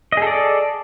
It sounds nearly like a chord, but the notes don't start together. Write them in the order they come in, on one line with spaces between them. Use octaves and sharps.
D#5 G#4 A4 D5